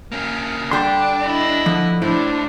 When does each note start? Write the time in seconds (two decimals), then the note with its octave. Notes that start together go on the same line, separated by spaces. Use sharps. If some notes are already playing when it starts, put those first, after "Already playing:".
0.12 A#3 C#4
0.71 D3 G3 D4 G4 C6
1.24 E4 D#5
1.66 D3 F3
2.02 A2 D4 E4 C5